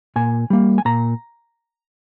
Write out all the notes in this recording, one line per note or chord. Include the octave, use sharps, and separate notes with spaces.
A#2 G#5
G3 A#3
G#5
A#2 A#5